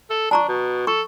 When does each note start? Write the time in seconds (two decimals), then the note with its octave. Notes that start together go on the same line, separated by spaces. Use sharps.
0.10 A4
0.31 D4 A5 A#5 C#6
0.48 B2
0.87 A4 C#6